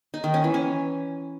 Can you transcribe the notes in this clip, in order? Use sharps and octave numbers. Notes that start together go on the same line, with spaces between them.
D#4
D#3
C#4
E3
C#4